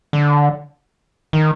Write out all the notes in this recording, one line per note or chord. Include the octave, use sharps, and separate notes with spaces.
D3
D#3